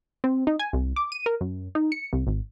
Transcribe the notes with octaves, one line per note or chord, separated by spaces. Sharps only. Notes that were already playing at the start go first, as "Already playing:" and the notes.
C4
D#4
G#5
C2
D6
D#7
A#4
F#2
D#4
C#7
C2
G#1